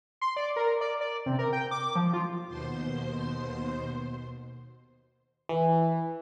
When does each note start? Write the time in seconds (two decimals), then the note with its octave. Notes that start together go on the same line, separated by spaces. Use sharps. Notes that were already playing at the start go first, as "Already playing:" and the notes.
0.21 C6
0.36 D5
0.56 A#4
0.81 D5
1.01 D5
1.26 C3
1.39 A#4
1.53 G5
1.71 D6
1.96 F3
2.14 F4
2.48 D#2 B2 C5 C6
5.49 E3